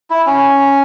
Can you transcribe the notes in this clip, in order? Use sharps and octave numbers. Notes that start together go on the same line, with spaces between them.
E4
C#4